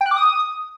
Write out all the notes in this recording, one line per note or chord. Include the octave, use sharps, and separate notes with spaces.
G5
F#6
D6
D#6